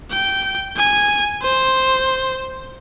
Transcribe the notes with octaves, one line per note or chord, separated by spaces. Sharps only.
G5
G#5
C5